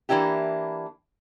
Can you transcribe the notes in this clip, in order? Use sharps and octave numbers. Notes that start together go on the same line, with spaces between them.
E3 A#3 D4 E4 G4